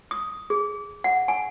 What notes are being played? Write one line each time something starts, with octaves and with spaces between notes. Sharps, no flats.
D#6
G#4
F#5
G#5